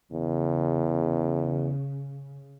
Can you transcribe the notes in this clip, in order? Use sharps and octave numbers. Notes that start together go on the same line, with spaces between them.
E2 C#3